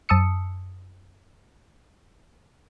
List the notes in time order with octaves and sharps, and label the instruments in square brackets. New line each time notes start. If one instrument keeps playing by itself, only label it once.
[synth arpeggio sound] F#2 A5 D#6 E6 C#7